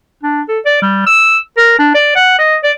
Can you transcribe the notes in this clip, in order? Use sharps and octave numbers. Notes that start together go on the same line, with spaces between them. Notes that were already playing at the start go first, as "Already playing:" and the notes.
D4
A4
D5
G3
E6
A#4
D4
D5
F#5
D#5
D5